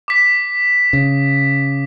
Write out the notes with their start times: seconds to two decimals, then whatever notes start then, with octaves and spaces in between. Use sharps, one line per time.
0.08 D6 B6
0.93 C#3